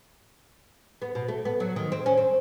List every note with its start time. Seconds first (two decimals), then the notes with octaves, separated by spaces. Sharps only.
1.02 B3
1.15 B2
1.28 A3
1.45 B3
1.60 F#3
1.76 D#3
1.92 C4
2.06 C#4
2.18 C4